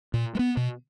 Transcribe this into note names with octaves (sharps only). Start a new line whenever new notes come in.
A#2
G#3
B3
B2